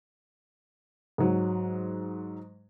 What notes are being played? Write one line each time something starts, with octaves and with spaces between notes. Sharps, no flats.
G#2 F#3